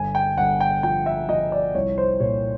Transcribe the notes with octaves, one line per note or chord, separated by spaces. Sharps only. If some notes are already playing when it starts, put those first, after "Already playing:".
Already playing: G1 G#5
G5
G1 F#5
G5
F3 G5
E5
F3 D#5
D5
C2 C#5
C5
A#2 C#5